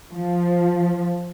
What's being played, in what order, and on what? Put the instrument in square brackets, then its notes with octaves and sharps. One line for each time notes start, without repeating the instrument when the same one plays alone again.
[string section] F3